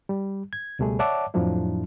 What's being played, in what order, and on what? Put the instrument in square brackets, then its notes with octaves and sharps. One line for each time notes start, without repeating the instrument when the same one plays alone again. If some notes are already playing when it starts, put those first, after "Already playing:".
[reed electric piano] G3
G#6
C#2 B2 G3 A3 G#4
C#5 D5 E5 F#5 A5 D6
F2 A2 F3 F#3 D4 E4